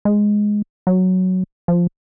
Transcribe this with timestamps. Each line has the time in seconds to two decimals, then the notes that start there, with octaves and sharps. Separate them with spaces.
0.05 G#3
0.87 F#3
1.68 F3